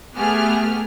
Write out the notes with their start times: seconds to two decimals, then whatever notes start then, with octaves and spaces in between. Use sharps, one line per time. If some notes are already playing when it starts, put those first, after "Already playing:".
0.17 A3 B3 G4 G#4 F6